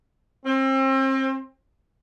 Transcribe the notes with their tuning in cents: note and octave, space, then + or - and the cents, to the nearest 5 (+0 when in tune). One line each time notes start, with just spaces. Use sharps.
C4 +35